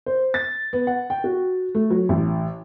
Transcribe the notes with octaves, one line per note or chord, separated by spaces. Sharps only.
C5
A6
B3
F#5
G5
F#4
A3
F#3
A1